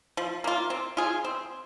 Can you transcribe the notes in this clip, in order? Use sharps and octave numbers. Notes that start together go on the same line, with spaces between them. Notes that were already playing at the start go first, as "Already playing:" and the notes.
F3
A#3 F4
C4
F4 G#4
C4